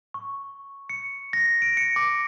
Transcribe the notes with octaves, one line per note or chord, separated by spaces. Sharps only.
C#6
C#7
A#6
D7
C#7
D6